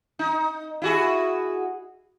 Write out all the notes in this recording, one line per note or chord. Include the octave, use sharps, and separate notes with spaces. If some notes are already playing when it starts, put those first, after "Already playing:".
D#4
E4 F#4 G#4